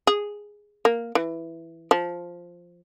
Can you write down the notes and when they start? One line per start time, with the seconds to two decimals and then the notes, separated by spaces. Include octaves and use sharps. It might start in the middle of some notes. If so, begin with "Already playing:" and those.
0.07 G#4
0.85 A#3
1.15 E3
1.91 F3